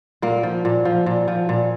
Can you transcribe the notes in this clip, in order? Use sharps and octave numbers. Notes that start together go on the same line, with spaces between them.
A#2 A#3
F3
A#2
F3
A#2
F3
A#2